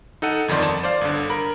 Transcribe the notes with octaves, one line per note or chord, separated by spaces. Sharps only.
D#4 A4 F#5 D#7
G1 F2 D#3 D5 C6
A5
C5 D5 F5
G1 D3
A#4 B5